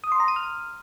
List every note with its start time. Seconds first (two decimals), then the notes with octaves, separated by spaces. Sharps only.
0.04 D#6
0.12 C6
0.20 A#5
0.28 D#7
0.36 F6